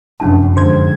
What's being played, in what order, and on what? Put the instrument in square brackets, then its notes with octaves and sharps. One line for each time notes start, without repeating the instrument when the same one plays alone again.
[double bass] F1 F#2 [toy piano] C#4 D4 A5
[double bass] F2 G#2 [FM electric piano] D3 C5 G#6